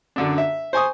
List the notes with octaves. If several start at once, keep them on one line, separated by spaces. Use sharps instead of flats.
F#2 D3 D4
E5
C5 G#5 C#6 D#6